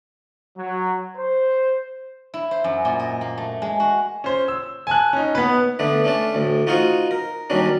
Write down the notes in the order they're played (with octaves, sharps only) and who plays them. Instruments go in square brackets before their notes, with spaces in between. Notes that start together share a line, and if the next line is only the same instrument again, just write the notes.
[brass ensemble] F#3
C5
[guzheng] E4
C5
F#2
A#2
D#5
A#3
A3
G#3
F#4
[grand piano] C#4 C5
E6
G#5 A5 F#6
C#4 D#4
B3 B4
[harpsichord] D3 A3 B3 D4
A3 C#4 D4 A5
D2 A2
D#4 F4 F#4 C5 F5 C#6
A#4
D#2 D#3 F#3 G3 C#4 D4